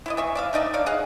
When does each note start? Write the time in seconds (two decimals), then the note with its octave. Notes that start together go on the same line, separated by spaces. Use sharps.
0.06 E4 D5 D#5
0.17 E3 E5 C#6
0.35 D5 E5 F5
0.53 A3 D#4 D5 D#5
0.74 C#5 D5 F5
0.86 G#4 D#5 F5 F#5